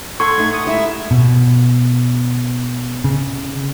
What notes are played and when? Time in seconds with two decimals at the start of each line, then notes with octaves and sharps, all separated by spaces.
0.20 A4 F#5 C6 C#6 G#6
0.38 A3 D#4
0.52 D#6
0.66 G#3 E4 G4 E5
1.11 B2
3.04 C#3